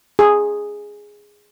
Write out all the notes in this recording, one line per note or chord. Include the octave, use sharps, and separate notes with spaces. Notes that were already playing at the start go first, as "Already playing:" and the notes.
G#4